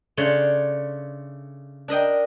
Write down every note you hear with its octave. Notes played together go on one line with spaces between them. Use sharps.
C#3 A3 D4 C#5 C6
D4 A#4 D#5 G5